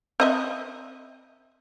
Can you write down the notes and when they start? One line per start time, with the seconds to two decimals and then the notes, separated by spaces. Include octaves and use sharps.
0.20 C4 D#5 E5